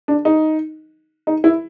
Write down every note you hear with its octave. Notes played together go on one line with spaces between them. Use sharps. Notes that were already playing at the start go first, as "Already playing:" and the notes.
D4
D#4
D#4
E4